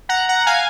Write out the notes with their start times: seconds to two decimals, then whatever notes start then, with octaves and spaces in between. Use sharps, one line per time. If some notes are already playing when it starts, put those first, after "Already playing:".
0.09 F#5 A#5
0.29 F#5 A#5
0.46 F5 G#5